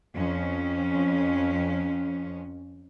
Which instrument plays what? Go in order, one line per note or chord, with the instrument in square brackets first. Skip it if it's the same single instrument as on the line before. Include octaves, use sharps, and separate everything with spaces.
[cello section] F2 C#4